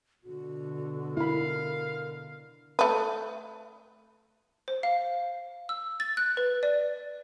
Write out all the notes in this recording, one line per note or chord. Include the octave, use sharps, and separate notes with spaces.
B2 D3 F#4
E4 A#4 F5 B5
A3 B4
C5
F5
E6
A6
F#6
B4
D5